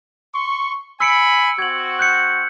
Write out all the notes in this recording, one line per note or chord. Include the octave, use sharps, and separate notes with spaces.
C6 C#6
G#5 B5 E6 C#7 D7
C4 F#4 G#6 F#7
F#6 G6 C#7